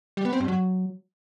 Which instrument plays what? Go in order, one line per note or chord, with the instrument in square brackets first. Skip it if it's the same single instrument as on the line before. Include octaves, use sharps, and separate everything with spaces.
[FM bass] G3
B3
C4
G2
F#3